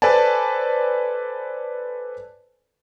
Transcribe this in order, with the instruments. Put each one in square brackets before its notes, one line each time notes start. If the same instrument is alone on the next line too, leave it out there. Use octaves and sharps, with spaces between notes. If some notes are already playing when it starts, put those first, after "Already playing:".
[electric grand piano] A4 B4 C5 D5 G#5 A5